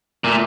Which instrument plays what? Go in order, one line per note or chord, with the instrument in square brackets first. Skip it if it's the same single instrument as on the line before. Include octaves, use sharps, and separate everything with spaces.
[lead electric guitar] A#2 [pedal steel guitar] A3